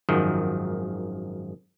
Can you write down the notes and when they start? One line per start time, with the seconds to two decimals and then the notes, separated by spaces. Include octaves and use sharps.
0.09 G#1 F#2 D#3 F3